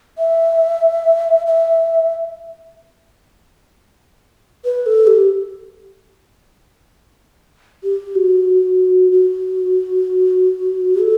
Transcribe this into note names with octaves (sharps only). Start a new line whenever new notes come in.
E5
E5
B4
A4
G4
G4
F#4
F#4
A4